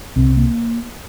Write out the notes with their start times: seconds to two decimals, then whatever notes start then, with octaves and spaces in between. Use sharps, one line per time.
0.16 C2 C3 C4
0.37 A#3